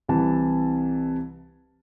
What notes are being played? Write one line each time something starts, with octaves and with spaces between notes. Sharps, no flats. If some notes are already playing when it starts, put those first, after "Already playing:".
C2 C3 E3 A5